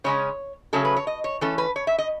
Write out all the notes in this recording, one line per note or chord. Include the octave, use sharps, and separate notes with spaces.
C#3 G#3 C#4 C#5
C#3 F#3 A3 C#4 A4
B4
C#5
D#5
C#5
E3 A3 C#4 A4
B4
C#5
E5
D#5